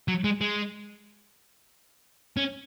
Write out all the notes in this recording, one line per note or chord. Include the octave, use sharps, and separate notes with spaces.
F#3
G#3
G#3
C#4